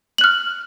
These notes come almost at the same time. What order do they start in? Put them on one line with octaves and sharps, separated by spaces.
F#7 F#6 F6